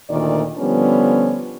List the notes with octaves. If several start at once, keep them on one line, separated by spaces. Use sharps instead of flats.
D2 A#2 D#3 D5
D3 F3 G3 B3 C#4